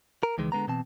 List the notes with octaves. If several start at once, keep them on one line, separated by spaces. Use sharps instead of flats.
A#4
C#2 D#3 E3 G#3
D3 G#3 B3 A#5
B2 E3 C4 A5